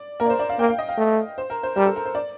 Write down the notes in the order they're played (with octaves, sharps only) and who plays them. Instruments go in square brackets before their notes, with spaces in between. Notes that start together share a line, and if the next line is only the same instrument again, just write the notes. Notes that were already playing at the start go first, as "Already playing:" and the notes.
Already playing: [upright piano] D5
[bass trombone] A#3 [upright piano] A#4
[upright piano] D5
C5
D5
F5
[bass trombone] A#3 [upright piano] G5
[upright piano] F5
D#5
F5
[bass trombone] A3
[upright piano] C5
A#4
C5
[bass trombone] G3 [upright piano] A#4
[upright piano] A4
A#4
C5
D5